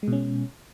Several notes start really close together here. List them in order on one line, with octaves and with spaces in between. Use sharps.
G#3 B2 C#4